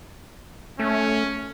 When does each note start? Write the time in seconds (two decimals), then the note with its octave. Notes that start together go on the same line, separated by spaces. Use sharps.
0.80 A3 C#4